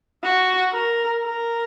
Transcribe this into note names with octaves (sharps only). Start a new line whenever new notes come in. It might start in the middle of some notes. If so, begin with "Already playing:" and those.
F#4
A#4
A#4